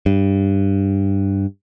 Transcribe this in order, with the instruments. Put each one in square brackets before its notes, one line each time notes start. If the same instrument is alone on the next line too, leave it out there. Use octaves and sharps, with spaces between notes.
[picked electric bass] G2